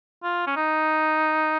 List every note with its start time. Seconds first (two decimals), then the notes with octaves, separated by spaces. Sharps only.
0.23 F4
0.47 C#4
0.57 D#4